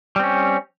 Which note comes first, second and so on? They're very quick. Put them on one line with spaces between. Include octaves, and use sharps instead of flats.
G3 C4 C#4